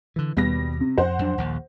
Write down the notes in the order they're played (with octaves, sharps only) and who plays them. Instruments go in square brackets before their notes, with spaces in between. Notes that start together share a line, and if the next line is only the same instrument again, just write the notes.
[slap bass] D3 E3
[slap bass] D#2 B2 [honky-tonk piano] G3 B3 A#6
[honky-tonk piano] C3
[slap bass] F2 [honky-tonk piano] C5 F#5
[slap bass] F2 F#3 D4
A#1 D#2